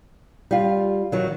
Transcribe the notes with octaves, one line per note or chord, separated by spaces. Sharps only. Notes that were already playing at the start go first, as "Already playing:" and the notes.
G3 F4
D#3 F#3